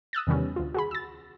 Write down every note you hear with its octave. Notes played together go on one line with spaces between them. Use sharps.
D#6 E6 F#6 A6
E2 C3 D#3 G3 B3 C#4
D2 F4
F#4 G#4 B5
E6 A6